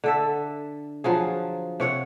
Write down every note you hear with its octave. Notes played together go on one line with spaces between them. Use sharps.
D3 A4 E5
F3 F#3 F4 G#4
C3 C#5 F#5